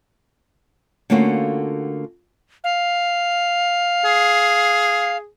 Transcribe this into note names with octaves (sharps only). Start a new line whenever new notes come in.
D3 A3 A#3 C#4 F4 F#4
F5
G#4